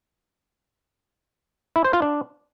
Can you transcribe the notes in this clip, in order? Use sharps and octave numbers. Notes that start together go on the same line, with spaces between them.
E4
C5
F4
D4